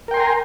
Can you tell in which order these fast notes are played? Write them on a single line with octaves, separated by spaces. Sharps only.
A#4 G5 C6 G#5 A#5